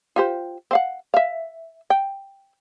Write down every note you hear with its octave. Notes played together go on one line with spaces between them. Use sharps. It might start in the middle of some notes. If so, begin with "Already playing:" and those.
F4 G4 C5
C4 F5 F#5
E5 F5
G5